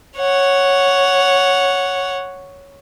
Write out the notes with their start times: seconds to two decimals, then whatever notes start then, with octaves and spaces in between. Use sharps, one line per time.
0.17 C#5 F#5